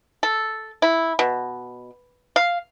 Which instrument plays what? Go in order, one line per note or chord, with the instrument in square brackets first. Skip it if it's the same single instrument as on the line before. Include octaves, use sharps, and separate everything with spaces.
[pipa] A4
E4
B2
F5